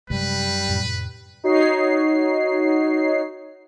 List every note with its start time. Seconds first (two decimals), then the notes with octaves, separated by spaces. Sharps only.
0.10 F#2 C3 G3 G#3 B4
0.69 F2 A2 C3
1.44 D#4 F#4 C#5 C7